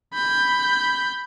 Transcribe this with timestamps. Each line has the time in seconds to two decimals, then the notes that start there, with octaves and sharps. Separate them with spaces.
0.14 B5 G6